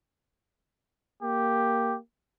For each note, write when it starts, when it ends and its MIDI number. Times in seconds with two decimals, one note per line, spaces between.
1.23 1.98 58
1.23 1.96 67